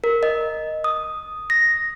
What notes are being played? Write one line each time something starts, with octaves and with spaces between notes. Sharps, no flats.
A#4
D#5
D#6
A#6